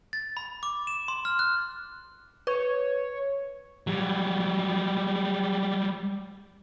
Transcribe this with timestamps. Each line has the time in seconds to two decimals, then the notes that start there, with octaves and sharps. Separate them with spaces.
0.13 A6
0.37 B5
0.63 D6
0.87 E7
1.08 C6
1.25 F6
1.39 F#6
2.47 B4 C#5
3.87 F#3 G3